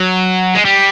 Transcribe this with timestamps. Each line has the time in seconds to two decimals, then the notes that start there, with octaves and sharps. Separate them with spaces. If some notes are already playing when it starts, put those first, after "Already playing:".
Already playing: F#3
0.55 G#3
0.65 G3